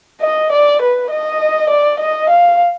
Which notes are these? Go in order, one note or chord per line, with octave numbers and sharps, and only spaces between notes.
D#5
D5
B4
D#5
D5
D#5
F5